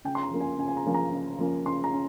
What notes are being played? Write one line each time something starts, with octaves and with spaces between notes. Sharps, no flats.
C#3 G5
C6
A#5
F3 A#3 C#4
G#5
C#3 G#5
G#5
A#5
F3 A#3 C#4
A#5
C#3
F3 A#3 C#4
C#3 C6
A#5
C#4